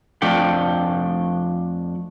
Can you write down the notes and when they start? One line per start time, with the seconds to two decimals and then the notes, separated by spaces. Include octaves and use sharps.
0.22 F2 F3 A3 D4 G5